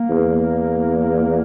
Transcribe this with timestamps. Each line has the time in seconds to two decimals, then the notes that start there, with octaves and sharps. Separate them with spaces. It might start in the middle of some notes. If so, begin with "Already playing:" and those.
Already playing: A#3
0.10 E2